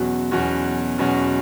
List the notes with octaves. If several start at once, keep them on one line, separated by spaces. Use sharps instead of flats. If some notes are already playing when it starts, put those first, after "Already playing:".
Already playing: E2 B2 F#3 C#4 F#4
E2 B2 F#3 C#4 F#4
E2 B2 F#3 C#4 F#4